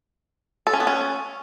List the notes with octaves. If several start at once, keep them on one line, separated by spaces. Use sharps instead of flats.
A4
C#4
B3
C#4